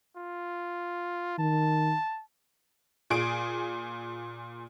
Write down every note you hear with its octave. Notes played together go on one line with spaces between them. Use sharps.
F4
D#3 A5
A#2 G#4 D7